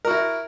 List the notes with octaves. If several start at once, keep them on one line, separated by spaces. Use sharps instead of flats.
E4 F#4 A#4